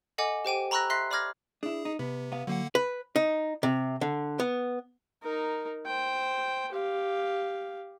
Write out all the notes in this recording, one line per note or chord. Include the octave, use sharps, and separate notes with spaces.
A4 D#5 F#5 G#5 D6
G4 C5 G5 D#7
A#5 B5 C#6 E6 F#6 A#6
E5 C6 F#6 A#6 C7
D5 B5 D6 F6 G#6 A#6
D4 E4 G#4
D#4
C3 B3
B3 F5
D3 F#3 A#3 F#5
B4
D#4
C3
D3
B3
D#4 A#4
C5 G5
G4 F5